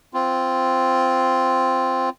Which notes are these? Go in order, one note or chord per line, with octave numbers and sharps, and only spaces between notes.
C4 F4